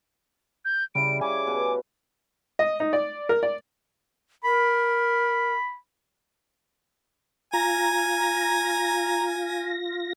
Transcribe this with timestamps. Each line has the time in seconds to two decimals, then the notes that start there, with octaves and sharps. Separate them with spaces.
0.65 G6
0.95 C#3 G3 E4 D7
1.21 C#3 G#5 D6
1.47 B2
2.59 D#5
2.80 D#4
2.93 D5
3.29 A#4
3.43 D5
4.44 A#4 B5
7.53 F4 G#5 A#5 A#6